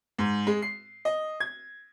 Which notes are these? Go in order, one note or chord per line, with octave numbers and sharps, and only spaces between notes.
G#2
G#3
C7
D#5
G#6